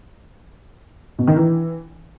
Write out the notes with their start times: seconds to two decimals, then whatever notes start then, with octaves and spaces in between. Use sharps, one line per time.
1.19 B2
1.27 D#3
1.36 E3